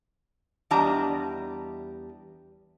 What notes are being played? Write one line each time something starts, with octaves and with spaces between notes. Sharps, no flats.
E2 G3 D4 D#5 A5 A#5